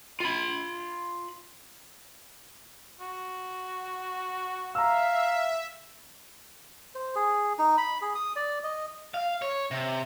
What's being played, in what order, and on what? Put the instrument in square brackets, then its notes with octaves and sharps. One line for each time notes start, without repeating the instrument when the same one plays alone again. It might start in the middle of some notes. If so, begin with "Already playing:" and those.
[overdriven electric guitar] F4 B5
[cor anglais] F#4
[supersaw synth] E5 [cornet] F5 [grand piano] A#5 E6
[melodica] C5
G#4
D#4
B5
G#4
D#6
D5
D#5
[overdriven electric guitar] F5
C#5
C3